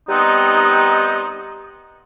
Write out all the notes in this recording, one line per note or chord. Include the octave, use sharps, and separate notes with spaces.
G3 B3 C4 D#4